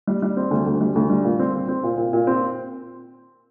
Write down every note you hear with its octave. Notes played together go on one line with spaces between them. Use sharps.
G3
G3
C4
D2
D2
G3
D2
G3
A#2
C4
C4
C4
A#2
A#2
A#2
C4